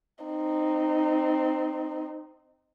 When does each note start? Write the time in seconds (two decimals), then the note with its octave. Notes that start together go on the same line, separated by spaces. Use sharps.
0.25 C4 D#4